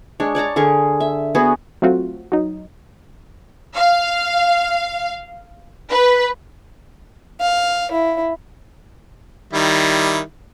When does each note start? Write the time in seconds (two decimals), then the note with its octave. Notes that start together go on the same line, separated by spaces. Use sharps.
0.20 G#3 D4 C#5
0.35 C#5 D5 A5 A#5
0.56 D3 G#4 A#4 C#6
1.00 E5
1.35 B3 F#4 G#4
1.82 F#3 A3 C4 F4 F#4
2.32 F#3 D#4
3.76 F5
5.90 B4
7.40 F5
7.91 E4
9.53 D#3 G3 E4